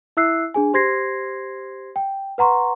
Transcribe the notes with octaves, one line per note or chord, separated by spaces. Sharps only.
E4 E5 E6 F#6 C7
D4 G#4 G#5
G4 C5 C6 G#6 A#6 C7
G5
B4 F#5 A#5 C6 C#6